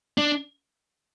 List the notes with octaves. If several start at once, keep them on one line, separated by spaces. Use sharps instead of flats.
D4